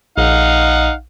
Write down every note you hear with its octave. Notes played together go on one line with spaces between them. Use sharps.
A#1 D#4 F5 F#5